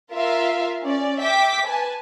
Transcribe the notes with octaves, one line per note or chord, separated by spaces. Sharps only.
F4 A#4 E5 F5
C#4 D5
E5 G5 D6 B6
B4 G#5 A5